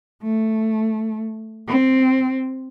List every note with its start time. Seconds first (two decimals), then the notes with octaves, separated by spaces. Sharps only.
0.22 A3
1.68 C4